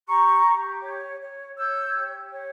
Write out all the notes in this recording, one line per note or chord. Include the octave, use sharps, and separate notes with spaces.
G4 A#5 C#6
G4
C#5
C#5
C#5 E6 G6
G4
C#5